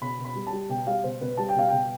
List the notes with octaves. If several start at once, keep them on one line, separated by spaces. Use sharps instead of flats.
B2 B5
B2
B5
G3
A5
G3
B2 G5
G3 F5
B2 C5
B2 B4
G3 A5
G5
B2 F5
B2 G5